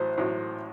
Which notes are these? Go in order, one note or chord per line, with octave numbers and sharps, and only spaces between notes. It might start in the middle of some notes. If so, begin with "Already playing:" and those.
Already playing: A1 A2 F#3 C5
A1 A2 F#3